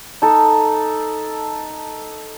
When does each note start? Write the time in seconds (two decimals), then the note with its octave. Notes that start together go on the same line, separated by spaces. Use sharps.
0.22 D#4 A4